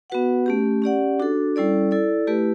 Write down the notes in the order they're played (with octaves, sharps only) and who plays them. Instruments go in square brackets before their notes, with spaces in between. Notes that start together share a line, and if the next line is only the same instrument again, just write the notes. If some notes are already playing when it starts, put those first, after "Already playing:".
[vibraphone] B3 F#4 B4 F#5
A3 C#4 G4
C#4 G4 D5 F#5
D4 F#4 A4
G3 C#4 E4 A4 D5
E4 A4 D5
A3 E4 G4 B4